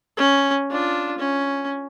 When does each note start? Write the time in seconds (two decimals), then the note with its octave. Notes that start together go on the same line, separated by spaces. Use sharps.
0.17 C#4
0.71 D4 F4
1.19 C#4